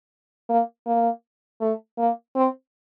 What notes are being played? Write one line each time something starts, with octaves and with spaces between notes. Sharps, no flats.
A#3
A#3
A3
A#3
C4